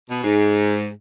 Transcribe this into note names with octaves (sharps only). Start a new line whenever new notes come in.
B2
G#2